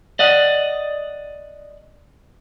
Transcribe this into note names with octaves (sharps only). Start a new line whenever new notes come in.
D5 D#5 F#5